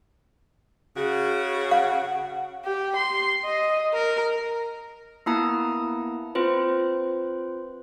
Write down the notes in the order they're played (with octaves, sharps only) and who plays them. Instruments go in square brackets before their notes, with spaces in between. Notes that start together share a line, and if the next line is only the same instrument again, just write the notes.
[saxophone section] C#3 F#4 [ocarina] G#4
[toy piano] F5 [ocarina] F#5
[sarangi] G4
C6
D#5
A#4
[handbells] A#3 B3 E4 A5 A#5 D#6
C4 F4 B4 C5